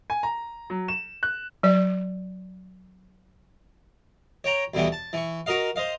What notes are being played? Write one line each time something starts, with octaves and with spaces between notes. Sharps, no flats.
G#5
A#5
F#3
E7
F#6
F#3 D5
C#5 G5 A#5
D2 G2 B2 E3 G3 B3
A5
E3 C#6
F#4 A#4 D#5 F5
C5 D#5 F5